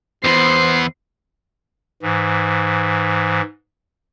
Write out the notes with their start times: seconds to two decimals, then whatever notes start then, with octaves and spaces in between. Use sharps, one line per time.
0.24 E2 B3 C5 C7
2.02 G#2 E3